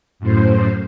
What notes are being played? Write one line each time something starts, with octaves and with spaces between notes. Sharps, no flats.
F#2 A2 C5